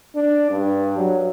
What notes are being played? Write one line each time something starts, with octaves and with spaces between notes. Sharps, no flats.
D4
G2
F#3